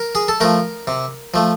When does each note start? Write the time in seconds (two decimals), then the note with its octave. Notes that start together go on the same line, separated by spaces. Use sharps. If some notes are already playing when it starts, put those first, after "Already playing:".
Already playing: A#4
0.15 G#4
0.28 A4
0.40 F3 A3 A#4
0.87 C3
1.34 F3 A3